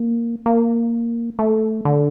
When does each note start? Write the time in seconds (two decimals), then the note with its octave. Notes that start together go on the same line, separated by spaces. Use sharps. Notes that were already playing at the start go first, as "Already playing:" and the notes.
Already playing: A#3
0.46 A#3
1.39 A3
1.85 D3